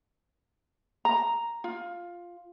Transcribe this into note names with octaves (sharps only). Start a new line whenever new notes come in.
A#5
F4